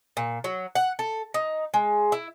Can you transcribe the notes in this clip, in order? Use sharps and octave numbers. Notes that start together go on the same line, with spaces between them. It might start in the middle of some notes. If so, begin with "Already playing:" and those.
A#2
F#3
F#5
A4
D#4
G#3
E4